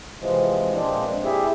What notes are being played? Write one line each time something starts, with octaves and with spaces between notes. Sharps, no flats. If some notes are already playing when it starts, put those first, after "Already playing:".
C3 E3 F3 G#3
A#2 G#3 C4 D4
E4 G4 G#4 E5